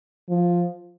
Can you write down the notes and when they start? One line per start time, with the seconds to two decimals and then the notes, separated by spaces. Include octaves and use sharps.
0.29 F3